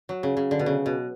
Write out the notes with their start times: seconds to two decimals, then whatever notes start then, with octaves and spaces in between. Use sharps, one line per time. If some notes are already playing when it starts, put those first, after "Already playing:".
0.09 F#3
0.23 C#3
0.37 C#3
0.51 D3
0.59 B2
0.66 C#3
0.86 B2